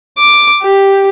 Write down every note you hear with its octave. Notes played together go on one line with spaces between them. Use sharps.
D6
G4